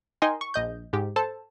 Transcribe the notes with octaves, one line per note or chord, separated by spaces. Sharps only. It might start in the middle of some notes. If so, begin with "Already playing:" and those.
D#4 A#4 D#5 G5 G#5 C6
C#6
A#1 D#5 G6
G#2 G4
A4 C5 A5